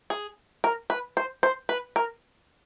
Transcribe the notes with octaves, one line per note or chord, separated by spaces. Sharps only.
G#4
A#4
B4
C5
C5
B4
A#4